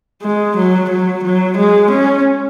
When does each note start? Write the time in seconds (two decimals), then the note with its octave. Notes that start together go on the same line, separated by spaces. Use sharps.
0.23 G#3
0.57 F#3
0.90 F#3
1.24 F#3
1.57 G#3
1.91 C#4